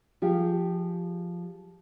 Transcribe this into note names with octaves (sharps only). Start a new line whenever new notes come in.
F3 G4 G#4